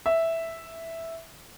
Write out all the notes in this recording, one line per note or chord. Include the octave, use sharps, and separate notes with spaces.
E5